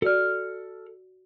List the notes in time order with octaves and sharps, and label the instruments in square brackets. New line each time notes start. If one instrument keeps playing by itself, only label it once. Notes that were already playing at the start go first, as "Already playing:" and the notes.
[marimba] F#4 D5 [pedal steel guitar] A4 F6